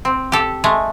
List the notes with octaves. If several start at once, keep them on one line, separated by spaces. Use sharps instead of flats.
C4
G4 A4
G#3 A3